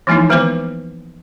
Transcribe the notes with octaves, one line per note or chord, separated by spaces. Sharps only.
E3 F3 G#3 A#3 D#4 E4
D#3 G#3 B3 B4 C5 D6